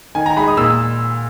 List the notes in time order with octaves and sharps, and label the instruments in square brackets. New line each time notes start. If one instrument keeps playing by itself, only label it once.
[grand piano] D#3 G#5
A#5
G#3 D#4 B5
D#6
A#2 E6